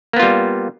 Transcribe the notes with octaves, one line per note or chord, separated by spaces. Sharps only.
G3 A#3 B3 F4